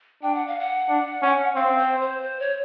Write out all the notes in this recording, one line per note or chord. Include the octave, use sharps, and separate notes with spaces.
D4 G5
F#5
F5
F#5
D4
C#4
C4 F5
C5
C5
C5
C#5